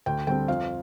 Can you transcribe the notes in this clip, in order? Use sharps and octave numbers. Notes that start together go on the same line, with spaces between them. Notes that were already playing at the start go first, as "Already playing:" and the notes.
D2 G5
D3 G3 C4 G5
F2 F5